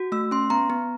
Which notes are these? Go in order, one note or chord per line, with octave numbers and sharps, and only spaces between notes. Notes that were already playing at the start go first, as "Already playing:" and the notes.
Already playing: F#4
A3 E6
C#4 C6
B3 A#5
B3